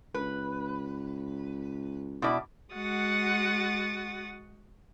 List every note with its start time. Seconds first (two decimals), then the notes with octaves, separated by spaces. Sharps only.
0.14 C#2 B4
2.22 B2 E4 D5
2.73 G#3 F#4 F#5 D#6 A6